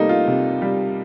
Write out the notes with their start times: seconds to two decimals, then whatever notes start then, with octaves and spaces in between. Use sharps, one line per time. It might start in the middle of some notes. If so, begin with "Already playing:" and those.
Already playing: C3 G3 A3 A#3 D#4
0.09 F4
0.27 C3
0.62 G3